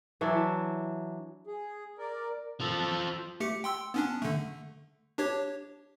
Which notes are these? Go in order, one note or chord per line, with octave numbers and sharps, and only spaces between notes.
E3 F#3 D4 E5
G#4
A#4 D5
F3 A4
A3 G4 C#7
G5 C6 E6
B3 C#4 D4
D3 A3
D4 G4 C#5